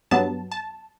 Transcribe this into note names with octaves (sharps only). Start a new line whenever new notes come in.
G2 F#3 B3 A5
A5